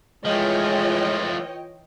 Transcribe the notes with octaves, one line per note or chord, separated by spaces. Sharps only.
E3 F3 G#3 A3 F4 C#5 D#5 G5